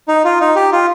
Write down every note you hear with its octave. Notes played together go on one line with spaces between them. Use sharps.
D#4
F4
D#4
G4
F4